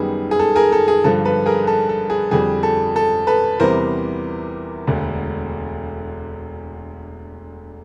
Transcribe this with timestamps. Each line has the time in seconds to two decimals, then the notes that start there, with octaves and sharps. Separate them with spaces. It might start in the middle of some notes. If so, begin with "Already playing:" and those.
Already playing: F#2 D#3 G3 B3 G#4
0.31 G#4
0.39 A4
0.56 G#4 A#4
0.72 A4
0.88 G#4
1.04 G2 D3 F3 A4
1.25 A4 B4
1.46 G#4 A#4
1.67 A4
1.89 A4
2.10 G#4
2.31 F2 D3 G3 G#4
2.63 A4
2.96 A4
3.27 A4 B4
3.60 E2 C3 E3 G3 B3 A#4 C5
4.87 E1 D2 D3